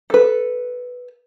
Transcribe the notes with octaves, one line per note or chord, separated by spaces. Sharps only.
A4 B4